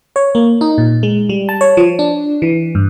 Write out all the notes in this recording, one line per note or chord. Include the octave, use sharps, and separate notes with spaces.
C#5
A#3
D#4
A#2
G#3
G3
A5
C#5
F3
D4
E3
G2